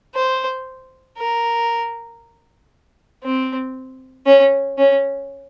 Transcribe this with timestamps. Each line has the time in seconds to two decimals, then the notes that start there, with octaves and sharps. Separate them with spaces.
0.15 C5
1.18 A#4
3.23 C4
4.26 C#4
4.78 C#4